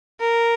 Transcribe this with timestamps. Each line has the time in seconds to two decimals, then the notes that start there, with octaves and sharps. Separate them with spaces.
0.20 A#4